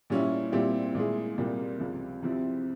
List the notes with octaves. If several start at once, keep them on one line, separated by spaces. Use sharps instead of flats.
A#2 G3 C#4 E4
A#2 G3 C4 E4 G4
A#2 G#3 E4 G#4
C2 A#2 G3 A#3
C#2 C3 F3
C2 C3 F3 C4 E4